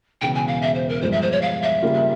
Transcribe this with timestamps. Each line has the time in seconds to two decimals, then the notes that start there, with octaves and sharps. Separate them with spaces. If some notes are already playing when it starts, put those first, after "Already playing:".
0.21 E1 E2 C#3 G5
0.35 G#5
0.48 F5
0.62 E5
0.75 C5
0.89 A#4
1.02 G2 F3 G#3 C5
1.12 E5
1.22 C5
1.32 C#5
1.42 F5
1.62 E5
1.82 C#3 G3 A#3 F4